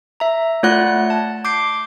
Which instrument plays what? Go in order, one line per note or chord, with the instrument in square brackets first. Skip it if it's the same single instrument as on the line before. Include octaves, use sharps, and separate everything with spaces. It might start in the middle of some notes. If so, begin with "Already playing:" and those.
[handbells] E5 A#5
A3 F4 C#5 D5 F#5 F#6
A5
D6 G6 C7 D7